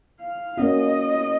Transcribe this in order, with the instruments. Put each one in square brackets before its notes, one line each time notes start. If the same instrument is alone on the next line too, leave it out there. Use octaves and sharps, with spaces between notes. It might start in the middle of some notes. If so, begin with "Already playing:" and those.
[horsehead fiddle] F5
[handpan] A#3 C#4 F#4 [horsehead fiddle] D#5